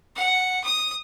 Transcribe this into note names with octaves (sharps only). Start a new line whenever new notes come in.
F#5
D#6